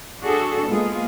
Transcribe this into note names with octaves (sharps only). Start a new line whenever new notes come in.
D4 F#4 G#4 A4
G#3 A#3 B3 F4 G#4